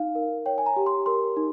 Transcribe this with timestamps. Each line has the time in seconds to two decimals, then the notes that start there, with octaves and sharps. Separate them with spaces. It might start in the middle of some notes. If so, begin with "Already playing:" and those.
Already playing: D#4 F5
0.15 A#4
0.46 C#5 G5
0.58 G#5
0.66 A#5
0.76 G4
0.86 C6
1.06 A#4 C6
1.36 D#4